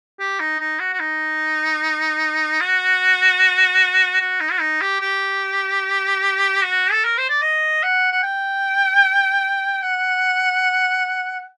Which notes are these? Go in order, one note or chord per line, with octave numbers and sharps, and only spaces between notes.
G4
D#4
D#4
F#4
F#4
D#4
F#4
F#4
D#4
F#4
D#4
G4
G4
F#4
A4
A#4
C5
D5
D#5
F#5
F#5
G5
F#5